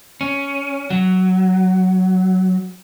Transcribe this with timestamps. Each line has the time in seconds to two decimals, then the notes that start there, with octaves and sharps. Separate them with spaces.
0.21 C#4
0.90 F#3